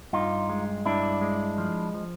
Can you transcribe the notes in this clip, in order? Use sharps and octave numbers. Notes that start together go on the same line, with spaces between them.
G2 D#4 F4
G#3
G2 D4 E4
G#3
F3
F3